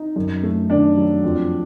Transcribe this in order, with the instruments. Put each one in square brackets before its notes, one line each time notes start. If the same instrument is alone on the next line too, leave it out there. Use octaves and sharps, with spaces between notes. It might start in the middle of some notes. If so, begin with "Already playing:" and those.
Already playing: [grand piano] D#4
F#2
A3
[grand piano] D#3 [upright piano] D4
[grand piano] F#3
F2